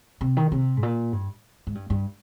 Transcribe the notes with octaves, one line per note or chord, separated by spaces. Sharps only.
C3
D#3
C3
G#2
A#2
G2
G#2
G2
G2